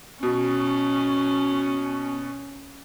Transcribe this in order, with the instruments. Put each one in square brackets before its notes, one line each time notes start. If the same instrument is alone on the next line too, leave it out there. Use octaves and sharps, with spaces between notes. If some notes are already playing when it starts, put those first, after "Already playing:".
[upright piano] B2 [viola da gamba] C#4